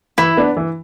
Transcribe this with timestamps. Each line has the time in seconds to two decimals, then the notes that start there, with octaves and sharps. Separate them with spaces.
0.18 E3 E4
0.37 B3 D4
0.57 E3